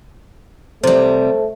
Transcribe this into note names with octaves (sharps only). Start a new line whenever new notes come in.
C3 G3 A3 C5